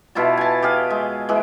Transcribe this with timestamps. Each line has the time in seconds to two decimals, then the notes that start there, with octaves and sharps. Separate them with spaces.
0.15 B2 E4 F4 A5
0.37 G#5 A5
0.62 G4 G#4 F5
0.90 G#3
1.29 E3 G#3